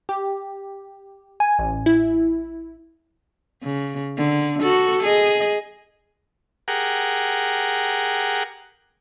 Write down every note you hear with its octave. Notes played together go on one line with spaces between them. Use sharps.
G4
G#5
A1
E4
C#3
D3
F#4 A4
G#4 D#5
G4 G#4 A#4 F#5